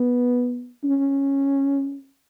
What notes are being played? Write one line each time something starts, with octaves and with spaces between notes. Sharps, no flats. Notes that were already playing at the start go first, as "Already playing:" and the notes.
Already playing: B3
C#4